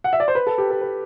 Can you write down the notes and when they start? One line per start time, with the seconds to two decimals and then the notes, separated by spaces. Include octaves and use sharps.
0.04 F#5
0.13 E5
0.20 D5
0.28 C5
0.35 B4
0.47 A4
0.58 G4
0.70 A4
0.81 B4